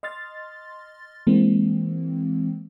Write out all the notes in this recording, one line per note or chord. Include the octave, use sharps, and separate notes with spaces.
D#5 C6 F6 A6
E3 G#3 A#3 C4